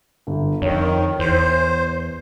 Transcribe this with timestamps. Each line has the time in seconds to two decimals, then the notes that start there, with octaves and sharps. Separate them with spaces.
0.27 G1
0.62 F2 D#3 C#5
1.19 E2 C5